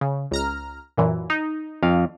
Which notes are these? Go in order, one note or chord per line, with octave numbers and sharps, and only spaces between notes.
C#3
C#2 A#5 F6
F#2 A#2 E3
D#4
F2 F5